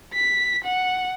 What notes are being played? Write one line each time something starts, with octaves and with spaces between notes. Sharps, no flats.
B6
F#5